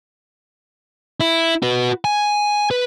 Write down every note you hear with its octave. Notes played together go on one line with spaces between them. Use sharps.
E4
F#4 B4
G#5
B4